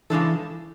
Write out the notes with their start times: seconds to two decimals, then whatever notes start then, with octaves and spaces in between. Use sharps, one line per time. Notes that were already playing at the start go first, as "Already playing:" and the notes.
0.10 C#3 E3 G#3 D4 A4